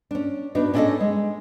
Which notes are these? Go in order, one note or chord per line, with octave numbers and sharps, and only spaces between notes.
C#4 D4
B3 D4 D#4 F#4
C#4 D4 E4 G4 A4 D#5
G#3